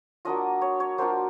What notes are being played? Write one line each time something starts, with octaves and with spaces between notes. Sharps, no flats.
F#3 A#3 D4 F4 D#5
C#5
C#5
F#3 A#3 D4 F4 C5